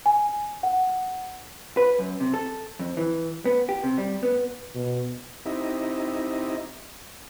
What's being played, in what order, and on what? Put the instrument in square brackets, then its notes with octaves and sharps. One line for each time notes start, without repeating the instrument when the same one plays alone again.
[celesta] G#5
F#5
[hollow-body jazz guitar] B4
F#2
C3
A4
F2
E3
B3
G4
C3
G3
B3
[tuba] B2
[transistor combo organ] C4 D#4 E4 G4 D#5 E5